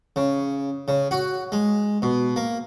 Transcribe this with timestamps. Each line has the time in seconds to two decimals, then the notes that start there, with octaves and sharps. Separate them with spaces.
0.16 C#3
0.88 C#3
1.11 F#4
1.52 G#3
2.02 B2
2.36 A#3